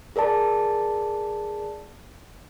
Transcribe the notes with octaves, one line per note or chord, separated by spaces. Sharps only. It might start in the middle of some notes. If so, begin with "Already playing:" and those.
G#4 A#4 D5 A5